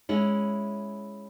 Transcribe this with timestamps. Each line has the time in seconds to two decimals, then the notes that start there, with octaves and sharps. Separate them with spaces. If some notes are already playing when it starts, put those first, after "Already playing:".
0.09 G#3 C#4 E4